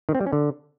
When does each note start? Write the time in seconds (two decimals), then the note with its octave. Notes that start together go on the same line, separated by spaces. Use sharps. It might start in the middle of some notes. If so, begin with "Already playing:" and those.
0.09 D#3
0.15 C4
0.21 G3
0.27 C#4
0.33 D3